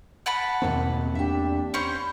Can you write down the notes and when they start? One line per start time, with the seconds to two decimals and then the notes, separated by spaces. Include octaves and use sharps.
0.26 F#5 A5 B5
0.62 E2 B2 D#3 A#3 C4 D#4
1.15 D4 G4 E5
1.74 C#4 C5 B5 C#6